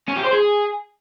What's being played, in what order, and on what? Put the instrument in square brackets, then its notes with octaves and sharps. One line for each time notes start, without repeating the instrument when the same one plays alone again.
[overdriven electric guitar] C#4
G4
C5
G#4